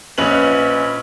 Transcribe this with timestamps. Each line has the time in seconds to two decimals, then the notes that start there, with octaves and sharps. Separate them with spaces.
0.18 A#1 C#4 B4 D#5 F#7